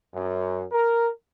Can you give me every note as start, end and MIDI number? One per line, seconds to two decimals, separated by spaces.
0.14 0.64 42
0.72 1.09 70